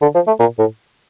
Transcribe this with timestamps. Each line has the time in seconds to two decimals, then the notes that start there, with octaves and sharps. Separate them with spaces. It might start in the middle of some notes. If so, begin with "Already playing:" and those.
0.02 D3
0.15 F3
0.27 A3
0.39 A#2
0.59 A2